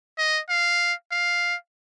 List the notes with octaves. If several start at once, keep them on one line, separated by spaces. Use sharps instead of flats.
D#5
F5
F5